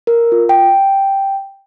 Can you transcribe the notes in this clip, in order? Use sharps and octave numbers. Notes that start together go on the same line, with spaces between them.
A#4
F4
G5